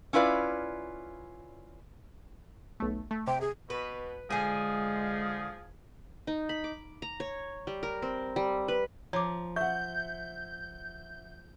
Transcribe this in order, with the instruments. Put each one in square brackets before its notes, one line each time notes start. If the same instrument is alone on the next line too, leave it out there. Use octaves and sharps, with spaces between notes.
[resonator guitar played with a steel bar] C#4 E4 F4 B4 D5
[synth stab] B1 A3
A3
[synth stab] C3 [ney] G5
[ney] G#4
[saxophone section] B2 [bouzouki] B4
[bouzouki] D3 G#5 [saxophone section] F3 G#4 [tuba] G#3
[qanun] D#4
B5
D6
A#5
C#5
G3
A#4
C4
G3
B4
[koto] F3 [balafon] C#5 D6 [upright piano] A#5
[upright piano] E5 F#5 [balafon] C#6 [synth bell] G6